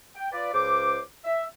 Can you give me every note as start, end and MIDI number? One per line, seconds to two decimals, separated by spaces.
0.16 0.28 79
0.33 0.51 65
0.33 0.51 71
0.33 0.51 74
0.53 0.99 37
0.53 0.99 72
0.53 0.99 86
1.25 1.43 76